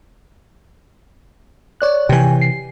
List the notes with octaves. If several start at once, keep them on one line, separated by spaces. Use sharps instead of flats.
C#5 D5 F#6
C3 E3 G5 G#5
C7